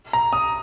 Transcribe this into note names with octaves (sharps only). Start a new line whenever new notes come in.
A#5
D#6